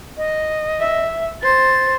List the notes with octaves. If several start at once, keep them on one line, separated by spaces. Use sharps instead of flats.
D#5
E5
C5 A6